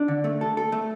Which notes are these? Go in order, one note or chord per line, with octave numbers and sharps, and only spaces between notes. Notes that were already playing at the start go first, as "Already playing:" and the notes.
Already playing: D4
D3
A3
A4
A4
A3